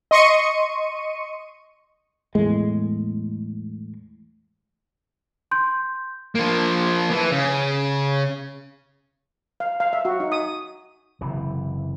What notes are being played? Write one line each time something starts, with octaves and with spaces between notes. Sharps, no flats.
D#5 C6 C#6 C#7 D#7
E2 A2 G#3
C6 G6
F3 A#3
E3
C#3
F5
F5
E5
F#4
D#4
D#6
F#1 C3 E3